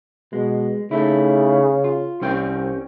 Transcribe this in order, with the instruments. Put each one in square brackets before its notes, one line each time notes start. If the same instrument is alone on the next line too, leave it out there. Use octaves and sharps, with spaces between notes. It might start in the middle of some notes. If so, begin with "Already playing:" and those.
[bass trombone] B2 [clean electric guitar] G#3
[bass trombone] C#3 [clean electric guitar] A3 D#4 E4
[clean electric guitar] F4
[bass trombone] C2 [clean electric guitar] C#4 C5 G5